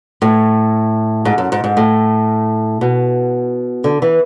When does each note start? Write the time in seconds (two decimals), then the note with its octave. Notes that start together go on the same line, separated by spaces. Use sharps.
0.22 A2
1.25 G#2
1.38 F#2
1.52 G#2
1.64 G#2
1.77 A2
2.81 B2
3.84 D3
4.02 E3